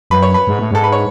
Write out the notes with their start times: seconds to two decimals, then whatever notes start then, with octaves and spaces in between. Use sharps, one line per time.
0.10 F#2 B4
0.22 C#5
0.34 B4
0.47 G#2
0.59 A2
0.71 G#2 A4
0.84 B4
0.92 C#5